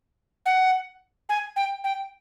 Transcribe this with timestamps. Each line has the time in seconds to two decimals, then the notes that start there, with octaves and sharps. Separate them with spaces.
0.46 F#5
1.29 G#5
1.56 G5
1.84 G5